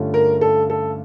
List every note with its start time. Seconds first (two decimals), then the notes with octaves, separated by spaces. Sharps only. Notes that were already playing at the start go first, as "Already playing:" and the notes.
Already playing: G2 D3 A3 C#4 F4
0.14 A#4
0.41 A4
0.70 A4